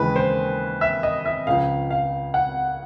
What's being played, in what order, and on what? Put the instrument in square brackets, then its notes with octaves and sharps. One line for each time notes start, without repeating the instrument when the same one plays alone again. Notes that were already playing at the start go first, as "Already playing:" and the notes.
Already playing: [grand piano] D#2 C#3 E3 G#3 B4
C5
E5
D#5
E5
C#2 C#3 F3 F5
F5
F#5